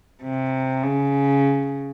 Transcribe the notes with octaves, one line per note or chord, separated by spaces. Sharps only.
C3
C#3